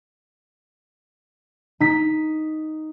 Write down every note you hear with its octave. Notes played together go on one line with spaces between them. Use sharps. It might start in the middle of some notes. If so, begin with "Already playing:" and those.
D#4 B6